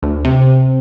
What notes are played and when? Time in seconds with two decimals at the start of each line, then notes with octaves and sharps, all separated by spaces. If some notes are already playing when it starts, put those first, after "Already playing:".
0.02 D2
0.25 C3